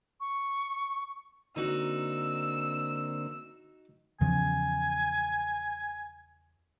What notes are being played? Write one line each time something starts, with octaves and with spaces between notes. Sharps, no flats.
C#6
D3 A#3 C4 D#4 F#4 E6
E2 C#3 F3 G#5